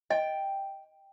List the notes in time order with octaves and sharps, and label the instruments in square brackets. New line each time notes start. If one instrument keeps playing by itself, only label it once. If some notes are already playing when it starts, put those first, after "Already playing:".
[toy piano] D#5 [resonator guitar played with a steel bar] G5